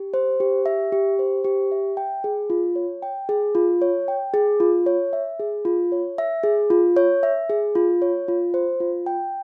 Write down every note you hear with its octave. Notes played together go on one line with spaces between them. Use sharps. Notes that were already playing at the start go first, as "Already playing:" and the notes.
Already playing: G4
C5
G4
E5
G4
C5
G4
E5
G5
G#4
F4
C#5
G5
G#4
F4
C#5
G5
G#4
F4
C#5
E5
G#4
F4
C#5
E5
G#4
F4
C#5
E5
G#4
F4
C#5
F4
C5
F4
G5